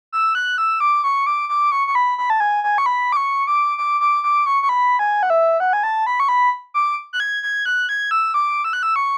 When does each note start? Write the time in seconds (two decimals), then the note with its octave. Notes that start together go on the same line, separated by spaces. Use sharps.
0.13 E6
0.35 F#6
0.58 E6
0.80 D6
1.04 C#6
1.27 D6
1.49 D6
1.72 C#6
1.87 C#6
1.95 B5
2.18 B5
2.30 A5
2.40 G#5
2.64 G#5
2.78 C#6
2.86 B5
3.12 D6
3.16 C#6
3.47 D6
3.78 D6
4.00 D6
4.23 D6
4.46 C#6
4.63 C#6
4.69 B5
4.99 G#5
5.23 F#5
5.30 E5
5.60 F#5
5.73 G#5
5.83 A5
6.06 B5
6.20 C#6
6.28 B5
6.74 D6
7.13 F#6
7.20 G#6
7.43 G#6
7.66 F#6
7.89 G#6
8.11 E6
8.34 D6
8.65 E6
8.73 F#6
8.83 E6
8.96 C#6